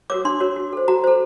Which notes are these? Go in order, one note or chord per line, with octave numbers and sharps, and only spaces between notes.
F#4 A#4 C#5 D6
D4 C6
F#4 A#4 C#5
F#4
A4 C5
F#4 A#5
A4 C5